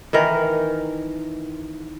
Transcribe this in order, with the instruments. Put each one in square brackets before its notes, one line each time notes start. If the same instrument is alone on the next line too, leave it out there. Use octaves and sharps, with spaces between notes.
[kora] D#3 E3 A#4